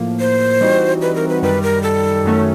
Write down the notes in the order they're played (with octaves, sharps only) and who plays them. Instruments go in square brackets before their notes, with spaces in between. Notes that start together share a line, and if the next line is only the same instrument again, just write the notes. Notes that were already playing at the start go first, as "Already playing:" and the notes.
Already playing: [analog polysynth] A2 F3 A#3
[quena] C5
[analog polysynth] E3 G3 C4 D#4 F#4
[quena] B4
A#4
B4
[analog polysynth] F#2 D#3 G3 [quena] B4
[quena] A#4
A4
[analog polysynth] F#2 D#3 F#3 A3 C#4